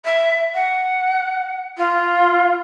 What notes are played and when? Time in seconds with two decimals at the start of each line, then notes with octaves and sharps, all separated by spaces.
0.04 E5
0.54 F#5
1.77 F4